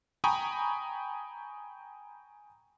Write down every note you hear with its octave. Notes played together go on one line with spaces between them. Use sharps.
G5 G#5 A#5 B5 C#6 D#6